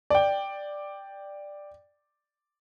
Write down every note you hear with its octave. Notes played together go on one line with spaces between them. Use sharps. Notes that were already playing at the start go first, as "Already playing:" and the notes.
D5 G5